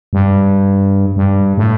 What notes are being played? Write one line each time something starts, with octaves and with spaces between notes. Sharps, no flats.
G2
G2
A2